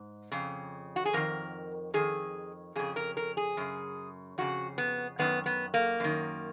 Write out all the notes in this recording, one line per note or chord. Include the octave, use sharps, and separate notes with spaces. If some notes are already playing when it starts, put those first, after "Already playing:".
Already playing: G#2
F2 C#3
F#4
G#4
F2 D#3 A#4
F2 D#3 G#4
F2 C#3 G#4
A#4
A#4
G#4
F#2 C#3
F2 C#3 F#4
B3
F#2 D#3 B3
B3
A#3
F#2 D#3